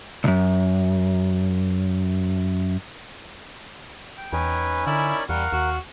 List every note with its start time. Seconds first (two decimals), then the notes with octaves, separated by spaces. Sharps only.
0.24 C2 F#2
4.17 G5
4.33 E2 C#4 D#4 B4 G#5
4.87 D3 E4 A#4 D5 B5
5.29 E2 G3 A#4 F5 F#5 C#6
5.53 D#2 F#4